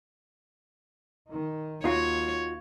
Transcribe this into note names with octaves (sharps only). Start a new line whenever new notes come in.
D#3 D#4
D#2 D#4 F4 F#4 C#5